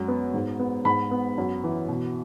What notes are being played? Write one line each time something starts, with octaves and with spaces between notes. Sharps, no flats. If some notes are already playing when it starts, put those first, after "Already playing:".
Already playing: F#2 G#3
B3
G#2
B3
G#2 B5
B3
F#2
E3
B2